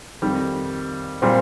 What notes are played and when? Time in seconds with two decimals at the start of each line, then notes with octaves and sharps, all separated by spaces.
0.22 F2 D#3 G3
1.22 A#2 G3 C4